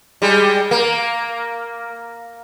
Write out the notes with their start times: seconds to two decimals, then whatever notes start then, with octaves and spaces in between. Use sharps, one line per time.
0.22 G3 G#3
0.71 A#3